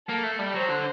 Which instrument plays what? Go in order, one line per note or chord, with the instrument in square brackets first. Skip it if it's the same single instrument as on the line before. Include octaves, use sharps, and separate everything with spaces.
[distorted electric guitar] A#3 [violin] A4
[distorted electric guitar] A3
G3
[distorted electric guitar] F#3 [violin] C5
[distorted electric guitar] D3